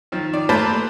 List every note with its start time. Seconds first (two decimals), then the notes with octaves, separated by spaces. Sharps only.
0.12 D#3 F3
0.33 D#3 D5
0.49 A3 A#3 B4 C5 A5